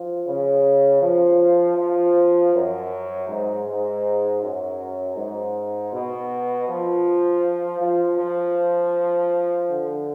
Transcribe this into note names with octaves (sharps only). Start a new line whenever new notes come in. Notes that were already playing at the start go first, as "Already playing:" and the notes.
Already playing: F3
C#3
F3
F3
F#2
G#2
G#2
F#2
G#2
B2
F3
F3
F3
D3